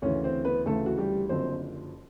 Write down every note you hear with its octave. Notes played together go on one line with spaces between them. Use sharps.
D2 C#3 E3 C#4 C#5
C4 C5
B3 B4
D2 C#3 E3 A3 A4
F#4
G3 G4
F#1 F#2 D3 F3 C4 C5